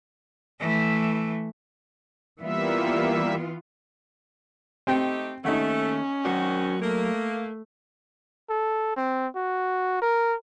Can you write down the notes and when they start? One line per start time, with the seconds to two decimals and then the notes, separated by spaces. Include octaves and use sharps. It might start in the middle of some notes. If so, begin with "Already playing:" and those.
0.60 E3 A3
2.41 E3 G3 A#3 B3 F4 E5
4.87 A3 C4 D#4 G4 G5
5.45 D#2 A3 C#4 D#4 F#5
6.25 D#3 F#3 C4 F#4 A#4 D5
6.82 A3 A#3
8.49 A4
8.96 C4
9.35 F#4
10.02 A#4